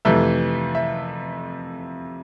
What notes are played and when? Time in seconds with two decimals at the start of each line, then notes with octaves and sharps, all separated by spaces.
0.05 F2 C3 E3 A3 E5
0.75 E5